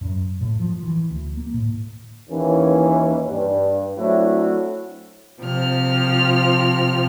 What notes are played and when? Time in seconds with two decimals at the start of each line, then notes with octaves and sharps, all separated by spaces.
0.01 F#2
0.41 A2
0.60 F3
0.82 E3
1.11 D2
1.37 A#3
1.54 A2
2.29 D#2 E3 C#4
3.27 G2
3.97 F#3 A3 C4 D4 E4 F#4
5.41 C3 F3 F6